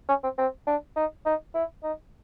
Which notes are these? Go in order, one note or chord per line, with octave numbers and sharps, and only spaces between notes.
C#4
C4
C4
D4
D#4
D#4
E4
D#4